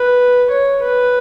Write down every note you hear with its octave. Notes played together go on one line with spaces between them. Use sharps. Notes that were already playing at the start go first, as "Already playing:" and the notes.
Already playing: B4
C#5
B4